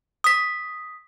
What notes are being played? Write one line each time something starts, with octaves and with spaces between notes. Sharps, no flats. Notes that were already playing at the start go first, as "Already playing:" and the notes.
D#6 B6